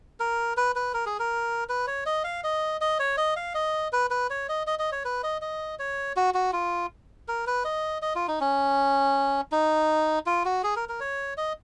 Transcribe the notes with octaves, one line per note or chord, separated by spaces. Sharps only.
A#4
B4
B4
A#4
G#4
A#4
B4
C#5
D#5
F5
D#5
D#5
C#5
D#5
F5
D#5
B4
B4
C#5
D#5
D#5
D#5
C#5
B4
D#5
D#5
C#5
F#4
F#4
F4
A#4
B4
D#5
D#5
F4
D#4
C#4
D#4
F4
F#4
G#4
A#4
A#4
C#5
D#5